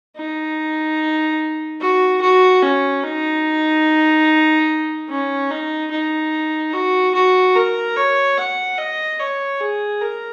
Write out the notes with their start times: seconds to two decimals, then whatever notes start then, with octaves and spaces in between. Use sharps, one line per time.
0.16 D#4
1.81 F#4
2.21 F#4
2.63 C#4
3.04 D#4
5.09 C#4
5.51 D#4
5.91 D#4
6.73 F#4
7.14 F#4
7.55 A#4
7.96 C#5
8.37 F#5
8.78 D#5
9.19 C#5
9.60 G#4
10.02 A#4